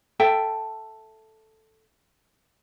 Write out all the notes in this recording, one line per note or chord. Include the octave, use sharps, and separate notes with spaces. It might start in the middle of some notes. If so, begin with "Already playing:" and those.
A4 E5 G5 A5